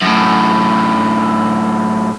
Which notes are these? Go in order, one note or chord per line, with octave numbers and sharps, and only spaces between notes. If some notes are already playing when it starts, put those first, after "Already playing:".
F#2 A2